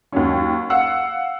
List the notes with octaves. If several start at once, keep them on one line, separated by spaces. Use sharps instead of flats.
D#2 F#3 C#4
F5 F#5 E6 C#7